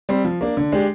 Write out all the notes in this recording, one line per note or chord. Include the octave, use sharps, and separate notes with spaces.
G3 C4
F3
A#3 D4
D3
G#3 D4 G4